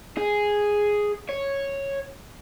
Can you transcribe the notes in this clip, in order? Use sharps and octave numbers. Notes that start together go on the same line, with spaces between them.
G#4
C#5